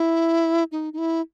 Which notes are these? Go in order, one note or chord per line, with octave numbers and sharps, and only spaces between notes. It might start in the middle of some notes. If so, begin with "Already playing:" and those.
Already playing: E4
D#4
D#4
E4